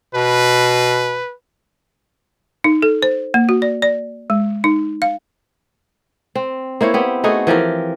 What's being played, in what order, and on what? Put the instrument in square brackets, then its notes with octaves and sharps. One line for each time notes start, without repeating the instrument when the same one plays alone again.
[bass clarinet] B2 [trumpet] B4
[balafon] D#4
A4
C5
A#3
F#4
D5
D5
G#3
D#4
F5
[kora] C4
A#3 E4 C5 C#5
B3 C4 G4
A3 D#4 F#4 G#4
E3 F3 G4 A#4